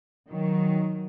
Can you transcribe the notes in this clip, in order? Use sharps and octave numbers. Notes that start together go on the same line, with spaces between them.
D#3 F#3